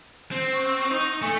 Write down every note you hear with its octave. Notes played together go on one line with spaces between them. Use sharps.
C4
C#6
D#4
A3 G#5